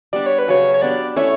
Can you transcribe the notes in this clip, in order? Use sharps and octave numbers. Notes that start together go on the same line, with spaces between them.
G3 B3 D4 D5
C#5
B4
C#3 F#3 C#4 C#5
C#5
B3 D4 G4 D5
A3 C#4 E4 C#5